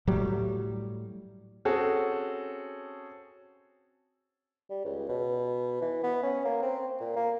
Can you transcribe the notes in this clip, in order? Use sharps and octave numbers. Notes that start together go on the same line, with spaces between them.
A2 F#3 G3
C4 C#4 F#4 G#4 A4
G3
C#2
B2
E3
B3
C#4
A#3
C4
A#2
A#3